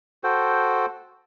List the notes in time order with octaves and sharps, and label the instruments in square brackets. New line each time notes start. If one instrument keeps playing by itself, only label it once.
[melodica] F#4 A4 C5 G5